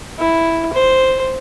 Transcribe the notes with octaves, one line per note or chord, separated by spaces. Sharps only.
E4
C5